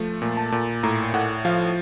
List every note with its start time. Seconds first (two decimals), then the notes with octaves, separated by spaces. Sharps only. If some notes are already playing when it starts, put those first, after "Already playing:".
Already playing: F3 A3
0.22 A#2
0.37 A5
0.52 A#2
0.83 A2 A#5
1.14 A2 F#5
1.45 F3 F5